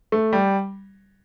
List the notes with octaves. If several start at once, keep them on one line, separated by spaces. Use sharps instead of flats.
A3
G3